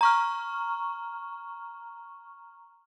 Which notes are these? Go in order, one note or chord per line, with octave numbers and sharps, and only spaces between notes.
A#5 C#6 F6